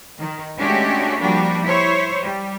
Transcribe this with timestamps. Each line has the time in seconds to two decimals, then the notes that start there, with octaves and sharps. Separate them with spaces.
0.19 D#3
0.58 G#3 A3 C#4 D4 F#4 G4
1.20 F3 G3 A#3 D4 F#4
1.65 E4 C5 C#5
2.22 G3